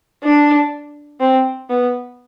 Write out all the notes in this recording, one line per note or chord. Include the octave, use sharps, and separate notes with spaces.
D4
C4
B3